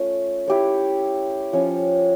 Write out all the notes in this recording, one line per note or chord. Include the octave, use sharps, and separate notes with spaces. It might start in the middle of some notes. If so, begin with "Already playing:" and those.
Already playing: A3 C#4 F4
E4 G4 C#5
F3 C#4 F4 C#5